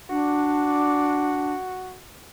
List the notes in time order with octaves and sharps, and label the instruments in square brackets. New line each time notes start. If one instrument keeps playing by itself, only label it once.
[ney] D4 [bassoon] F#4